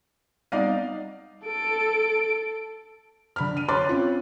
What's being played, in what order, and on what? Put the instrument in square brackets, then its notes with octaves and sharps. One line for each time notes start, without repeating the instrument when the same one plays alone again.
[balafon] G3 B3 C4 [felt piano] D#4 D5 F5
[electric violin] A4 D7
[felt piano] D3 B5 F6
D#7
C#5 B5 C6 D6 F#6 A6
C4 C#4 F4